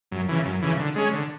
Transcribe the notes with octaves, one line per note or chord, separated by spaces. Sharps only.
F#2
C#3 E3
F#2
C#3 E3
D3
G#3 C#4
D3